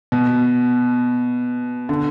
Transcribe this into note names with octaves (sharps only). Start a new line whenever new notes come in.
B2
D3